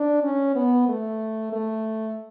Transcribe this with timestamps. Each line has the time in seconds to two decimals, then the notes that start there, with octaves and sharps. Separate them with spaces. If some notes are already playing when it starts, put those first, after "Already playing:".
Already playing: D4
0.24 C#4
0.55 B3
0.89 A3
1.53 A3